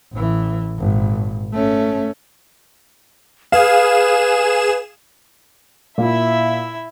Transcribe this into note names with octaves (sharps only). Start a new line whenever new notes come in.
A1 E3
G#1 A#2
A3 C#4
G#4 B4 F5 E7
A#2 E4 E5